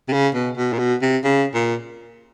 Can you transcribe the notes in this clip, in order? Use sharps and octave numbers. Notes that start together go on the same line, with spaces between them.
C3
C#3
B2
B2
A#2
B2
C3
C#3
A#2